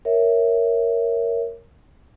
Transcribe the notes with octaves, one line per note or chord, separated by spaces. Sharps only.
A#4 C#5 E5